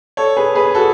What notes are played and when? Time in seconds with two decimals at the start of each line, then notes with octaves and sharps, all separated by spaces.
0.17 A4 C#5
0.37 G#4 B4
0.55 G#4 B4
0.65 G#4
0.75 F#4 A4